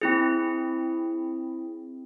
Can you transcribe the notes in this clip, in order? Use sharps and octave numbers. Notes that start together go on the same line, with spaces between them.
C4 E4 G#4